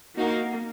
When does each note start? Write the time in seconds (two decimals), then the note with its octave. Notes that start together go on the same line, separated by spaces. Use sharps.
0.17 A#3 D#4 F#4 A#4 F5